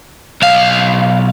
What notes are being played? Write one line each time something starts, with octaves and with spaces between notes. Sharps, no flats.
B1 F5